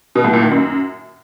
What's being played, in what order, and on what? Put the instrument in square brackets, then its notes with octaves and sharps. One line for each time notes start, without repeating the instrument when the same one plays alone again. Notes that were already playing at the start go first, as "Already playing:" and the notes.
[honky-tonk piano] B2
A2
A#2
D#3
F#2